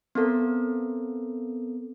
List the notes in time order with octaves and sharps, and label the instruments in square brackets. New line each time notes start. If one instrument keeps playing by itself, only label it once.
[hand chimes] B3 C4 A4 A#4